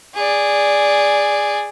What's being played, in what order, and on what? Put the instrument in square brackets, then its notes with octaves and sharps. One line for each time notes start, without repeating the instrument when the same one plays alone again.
[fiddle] G#4 D5